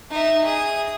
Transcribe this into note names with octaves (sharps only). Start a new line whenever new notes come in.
D#4 E5
G#4 D#6